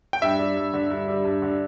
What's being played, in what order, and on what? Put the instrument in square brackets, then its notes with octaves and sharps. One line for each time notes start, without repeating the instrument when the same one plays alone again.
[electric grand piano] G5
[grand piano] G2 [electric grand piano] E5
[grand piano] G3
G2
D3
G2
G3
G2
D3